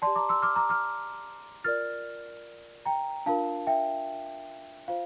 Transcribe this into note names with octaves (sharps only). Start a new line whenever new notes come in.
G4 D5 A5 C6
A#5 D6
C6 E6
D6 F6
A#5 D6
D6 F6
F4 A#4 D5 F6 A6
G5 A#5
D4 F4 A#4 F5 A5
E5 G5
F4 C5 F5